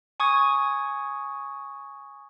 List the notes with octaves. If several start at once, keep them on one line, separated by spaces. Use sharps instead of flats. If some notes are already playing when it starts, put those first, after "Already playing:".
G#5 C#6 D#6 G#6